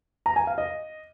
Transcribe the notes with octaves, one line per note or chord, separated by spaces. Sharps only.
A#5
G#5
F5
D#5